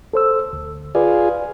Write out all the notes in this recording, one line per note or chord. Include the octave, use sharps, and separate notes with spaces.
A4 C5 E6
D2
F4 G#4 B4 D5